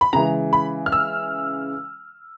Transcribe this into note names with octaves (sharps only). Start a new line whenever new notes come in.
B5
C#3 E3 G#3 A#5
B5
F6
E6